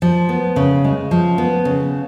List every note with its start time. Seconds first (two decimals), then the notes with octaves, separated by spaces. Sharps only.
0.02 F3
0.29 B3
0.56 C#3
0.84 G#3
1.11 F3
1.38 B3
1.65 C#3